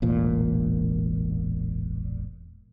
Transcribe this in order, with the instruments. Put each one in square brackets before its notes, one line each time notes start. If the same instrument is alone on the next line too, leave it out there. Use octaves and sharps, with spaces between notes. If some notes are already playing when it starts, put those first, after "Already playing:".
[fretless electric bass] E1 A1 A#2